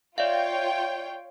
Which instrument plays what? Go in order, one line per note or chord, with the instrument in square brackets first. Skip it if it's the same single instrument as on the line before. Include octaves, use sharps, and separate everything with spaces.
[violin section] F4 C#5 G5 [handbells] D5 E5 F5